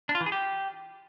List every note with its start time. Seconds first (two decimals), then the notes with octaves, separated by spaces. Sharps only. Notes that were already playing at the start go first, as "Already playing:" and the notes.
0.09 D4
0.15 F4
0.21 E3
0.26 G#4
0.32 G4